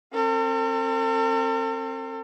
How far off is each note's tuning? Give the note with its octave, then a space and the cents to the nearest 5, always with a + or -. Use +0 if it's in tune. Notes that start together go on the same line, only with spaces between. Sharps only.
C4 +25 A4 +45